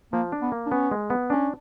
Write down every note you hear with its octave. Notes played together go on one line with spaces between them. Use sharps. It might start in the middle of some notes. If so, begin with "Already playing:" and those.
F3 A#3
D4
B3
A#3
D4
B3 C#4
G#3
B3
C#4 D4